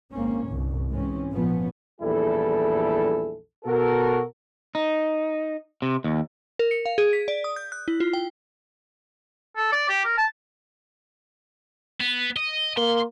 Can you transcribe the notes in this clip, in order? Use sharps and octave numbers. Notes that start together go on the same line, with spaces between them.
G#1 A#3 C4 C#4
G1 C2 G2
G#2 E3 G#3 C4 C#4
G#1 A#2 F3 B3 C#4
A#1 E2 G3 E4 G#4 A4
B2 F#4 A4 A#4
D#4
C3
D#2
A#4
C#7
F5
G#4
B6
D5
D#6
G6
F#6
E4
F4
G5
A4
D5
G4
A#4
A5
B3
D#5
A#3 C6